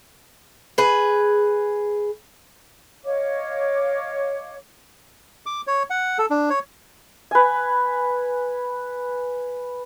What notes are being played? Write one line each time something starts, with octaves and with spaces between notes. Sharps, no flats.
G#4 B4
C#5 D#5 F5 D6
D6
C#5
F#5
A4
D4
C#5
B4 G#5